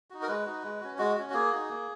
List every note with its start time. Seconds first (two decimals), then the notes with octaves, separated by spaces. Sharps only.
0.10 D#4 F#4
0.22 A#4
0.28 G#3 B4
0.46 D#4 F#4
0.63 G#3
0.81 C#4 F#4
0.98 G#3 F#4
1.17 C#4 F#4
1.30 F#4
1.34 A#3 G#4
1.52 D#4 F#4
1.69 A#3